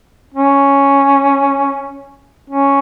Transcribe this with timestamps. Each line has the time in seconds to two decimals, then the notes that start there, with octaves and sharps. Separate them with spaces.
0.34 C#4
2.50 C#4